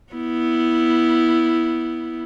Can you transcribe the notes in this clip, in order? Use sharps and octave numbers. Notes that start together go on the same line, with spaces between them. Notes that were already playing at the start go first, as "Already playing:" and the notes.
B3 E4